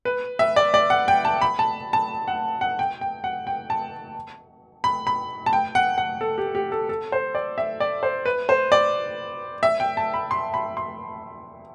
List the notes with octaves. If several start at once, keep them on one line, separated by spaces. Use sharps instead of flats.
B4
E5
D5
D5
F#5
G5
A5
B5
A5
A5
F#5
F#5
G5
G5
F#5
G5
A5
B5
B5
A5
G5
F#5
F#5
A4
G4
G4
A4
A4
C5
D5
E5
D5
C5
B4
C5
D5
E5
G5
A5
B5
C6
B5
C6